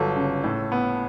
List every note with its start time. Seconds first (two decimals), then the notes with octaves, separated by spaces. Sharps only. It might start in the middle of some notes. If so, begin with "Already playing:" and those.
Already playing: G1 F#3 A4
0.16 C#3
0.44 A2
0.72 B3